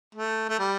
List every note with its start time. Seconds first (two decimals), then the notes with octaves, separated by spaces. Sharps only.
0.15 A3
0.49 A3
0.59 G3